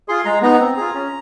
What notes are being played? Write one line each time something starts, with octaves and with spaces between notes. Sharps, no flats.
F4 G#4 C6
G#3 A#5
B3 D#4 A#5
C4
F4 G#4
C#4